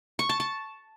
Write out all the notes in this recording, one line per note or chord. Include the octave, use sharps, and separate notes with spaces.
C#6
A5
A5